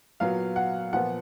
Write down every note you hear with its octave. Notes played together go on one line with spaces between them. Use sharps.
A#2 F#3 B3 F5
F#5
A#2 F3 B3 F#5